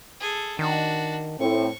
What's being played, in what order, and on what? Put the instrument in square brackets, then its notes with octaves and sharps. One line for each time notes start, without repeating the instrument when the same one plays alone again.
[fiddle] G#4 A4
[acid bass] D#3 [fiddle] D4 F#4
[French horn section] A2 C4 [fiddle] C#6